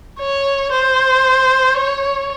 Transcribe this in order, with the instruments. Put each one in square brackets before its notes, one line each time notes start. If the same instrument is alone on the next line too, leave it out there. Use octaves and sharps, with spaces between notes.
[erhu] C#5
C5
C#5